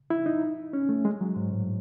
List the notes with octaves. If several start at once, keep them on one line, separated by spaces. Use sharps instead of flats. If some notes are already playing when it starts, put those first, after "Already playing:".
E4
D#4
C#4
A3
G#3
F#3
G#2
A2